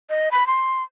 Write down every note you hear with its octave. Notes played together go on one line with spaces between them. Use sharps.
D#5
B5
C6